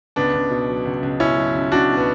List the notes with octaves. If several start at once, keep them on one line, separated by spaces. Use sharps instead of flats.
C#2 B3 D4
C#2
B2
F#3
C#2
C#2
B2 C#4 E4
F#3
C#2
C#2 D4 F#4
B2
B3